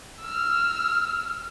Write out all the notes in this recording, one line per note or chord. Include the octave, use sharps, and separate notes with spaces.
E6 F6